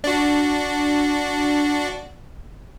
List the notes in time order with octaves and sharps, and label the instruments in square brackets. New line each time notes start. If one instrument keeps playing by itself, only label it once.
[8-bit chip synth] D4 F#4